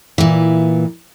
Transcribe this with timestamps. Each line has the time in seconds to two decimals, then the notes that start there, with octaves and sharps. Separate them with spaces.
0.18 A#2 E3